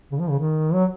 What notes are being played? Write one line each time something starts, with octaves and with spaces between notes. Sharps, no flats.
C#3
F3
C#3
D#3
F#3